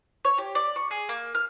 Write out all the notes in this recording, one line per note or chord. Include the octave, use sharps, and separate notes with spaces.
C#5
G4
D5
C#6
G#4
A#3
F6